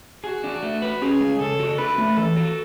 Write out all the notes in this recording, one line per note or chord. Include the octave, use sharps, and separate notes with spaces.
F#4 G#4
D4
A3
B4
C#4 G#4
G#3
C#3 A4
F#4
D4 B4
A3
E3 A4
F#4